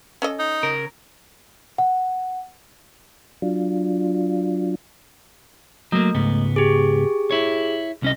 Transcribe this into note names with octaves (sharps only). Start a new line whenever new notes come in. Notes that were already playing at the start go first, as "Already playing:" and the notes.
C#4 A4 D#5
D#4
C#3 A#4
F#5
F#3 D4 F4
F#3 A3 A#3
C#2 G#2 B3
G4 G#4
E4 C#5
C2 C#4 D#5